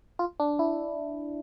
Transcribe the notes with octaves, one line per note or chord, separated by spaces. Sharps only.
F4
D4
E4